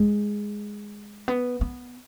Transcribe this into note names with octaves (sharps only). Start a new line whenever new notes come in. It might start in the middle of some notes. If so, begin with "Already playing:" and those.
Already playing: G#3
B3
B3